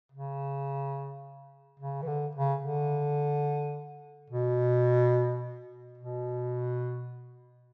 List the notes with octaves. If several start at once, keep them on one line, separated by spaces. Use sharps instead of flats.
C#3
C#3
E3
D3
C#3
D3
B2
B2